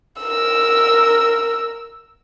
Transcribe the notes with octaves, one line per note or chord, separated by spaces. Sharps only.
A#4 E6